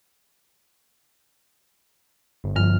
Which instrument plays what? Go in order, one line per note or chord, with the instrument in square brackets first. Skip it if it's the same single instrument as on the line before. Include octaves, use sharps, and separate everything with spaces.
[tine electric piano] G1
[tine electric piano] G1 F6 [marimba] G2 F3